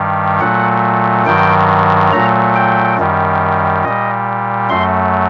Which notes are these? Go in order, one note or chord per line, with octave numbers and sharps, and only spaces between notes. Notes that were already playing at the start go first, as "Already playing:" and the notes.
Already playing: G2 D#3 G3
A#2 F#3 A3 F#5
G2 D#3 F#3 G5
A#2 F#3 A3 A#5
G5
F#2 D#3 G3
A#2 G3 D#5
F#2 F#3 A3 C6